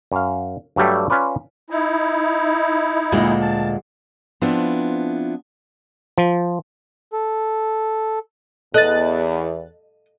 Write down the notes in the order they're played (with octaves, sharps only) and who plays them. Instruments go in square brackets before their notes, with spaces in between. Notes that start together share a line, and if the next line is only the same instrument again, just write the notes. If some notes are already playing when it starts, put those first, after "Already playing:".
[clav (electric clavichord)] F#2 F5
G2 F#3 G3 A3
C#4 F4 B4 D5
[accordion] D#4 E4
[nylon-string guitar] D2 A#2 G#3
[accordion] A5
[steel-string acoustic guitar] F3 B3 C4 D4 E4 F4
[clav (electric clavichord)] F3
[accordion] A4
[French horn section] E2 [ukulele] A4 [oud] D#5 [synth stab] F#6 A6